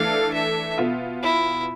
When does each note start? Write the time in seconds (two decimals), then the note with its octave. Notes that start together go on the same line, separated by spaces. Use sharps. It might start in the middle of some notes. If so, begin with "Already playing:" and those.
Already playing: E3 A3 D4 A4 F5
0.34 E5
0.78 B2 B3 F4
1.23 E4